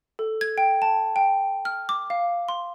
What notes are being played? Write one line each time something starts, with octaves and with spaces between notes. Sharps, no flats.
A4
G#6
G5
A5
G5
F6
D6
F5
C6